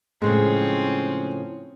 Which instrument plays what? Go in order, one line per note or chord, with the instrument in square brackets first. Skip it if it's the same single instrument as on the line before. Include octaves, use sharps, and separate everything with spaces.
[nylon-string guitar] A2 C#3 F3 [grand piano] G#3 [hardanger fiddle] C4 C#4